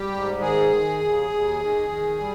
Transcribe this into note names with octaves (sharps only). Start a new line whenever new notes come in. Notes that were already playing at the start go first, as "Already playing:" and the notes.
Already playing: G3 G4
G#2
D#3 G#4
D#3
D#2
D#2
D#3
D#3
G3